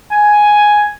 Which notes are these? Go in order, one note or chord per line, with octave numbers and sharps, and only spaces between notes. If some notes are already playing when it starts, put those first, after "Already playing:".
G#5